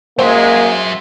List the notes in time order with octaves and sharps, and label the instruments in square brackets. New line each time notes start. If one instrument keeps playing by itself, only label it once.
[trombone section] F#2 G#3 [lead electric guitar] F#3 E5 [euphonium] A#3 [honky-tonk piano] C5 G5